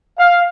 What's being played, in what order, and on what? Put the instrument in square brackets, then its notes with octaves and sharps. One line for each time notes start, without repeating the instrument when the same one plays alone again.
[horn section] F5